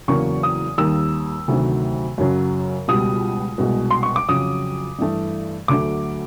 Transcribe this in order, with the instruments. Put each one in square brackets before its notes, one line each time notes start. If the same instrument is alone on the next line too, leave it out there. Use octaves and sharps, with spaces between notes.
[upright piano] E2 C#3 F#3 A#3 C#6
D#6
D#2 D#3 G3 A#3 E6
D2 C3 D#3 F#3
F#2 C#3 F#3
C#2 B2 G3 D#6
C2 B2 G#3
C6
C#6
D6
F2 C#3 F#3 D#6
G2 E3 A3
D2 D3 F#3 A3 D6